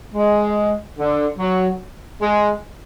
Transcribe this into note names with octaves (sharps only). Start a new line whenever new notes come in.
G#3
D3
F#3
G#3